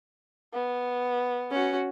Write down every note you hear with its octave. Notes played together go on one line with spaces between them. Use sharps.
B3
C#4 F#4